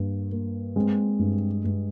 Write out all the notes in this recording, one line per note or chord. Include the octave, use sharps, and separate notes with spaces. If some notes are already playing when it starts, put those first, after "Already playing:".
Already playing: G2 A#3
A#3
G#3 C4
G2
G2